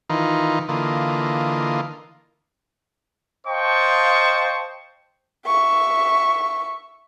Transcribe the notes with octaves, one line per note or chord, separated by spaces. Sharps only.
D#3 E3 D#4 F4
D3 E3 A#3 F4 D#5
C5 D#5 F5 G5 A5 C#6
E5 C#6